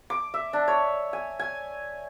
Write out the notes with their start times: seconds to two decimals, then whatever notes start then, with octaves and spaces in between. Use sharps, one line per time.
0.10 D6
0.34 E5
0.53 D4
0.68 C#5
1.13 G#5
1.39 G#5